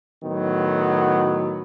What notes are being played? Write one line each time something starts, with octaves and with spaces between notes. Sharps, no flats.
A2 D#3 F#3 B3